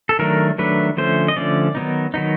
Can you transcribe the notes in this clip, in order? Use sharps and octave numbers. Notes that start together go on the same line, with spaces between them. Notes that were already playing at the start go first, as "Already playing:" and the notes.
A4
D#3 F#3 A3 D4 A#4
D#3 F#3 A3 D4 B4
D3 F3 A3 C#4 C5
D#5
D3 F3 A3 C#4 D5
D#3 F#3 B3 D#4
D#3 F#3 B3 D#4